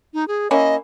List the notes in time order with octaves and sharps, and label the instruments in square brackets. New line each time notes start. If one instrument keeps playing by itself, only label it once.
[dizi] D#4
G#4
[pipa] A#3 C#4 E4 [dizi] D#5